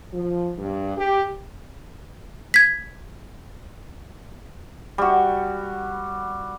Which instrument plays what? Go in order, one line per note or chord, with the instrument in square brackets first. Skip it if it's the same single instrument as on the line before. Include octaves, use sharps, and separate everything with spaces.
[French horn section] F3
G2
G4
[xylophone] G#6 B6
[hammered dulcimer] G3 F#4